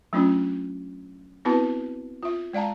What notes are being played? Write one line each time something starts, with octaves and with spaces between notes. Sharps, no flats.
F#3 A3 C#4 D4 F4
B3 C4 E4 F#4 B4 A5
F4 E5
G#3 D5 F5 A5 A#5